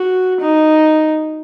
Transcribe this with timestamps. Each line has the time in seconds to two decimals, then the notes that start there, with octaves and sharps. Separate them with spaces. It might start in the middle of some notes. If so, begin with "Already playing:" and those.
Already playing: F#4
0.41 D#4